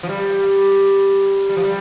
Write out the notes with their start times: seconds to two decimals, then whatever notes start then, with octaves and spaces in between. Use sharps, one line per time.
0.03 F3
0.09 G3
1.49 G3
1.57 F3
1.64 G3